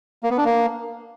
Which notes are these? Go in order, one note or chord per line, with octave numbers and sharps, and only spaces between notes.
A#3
B3
D4
A#3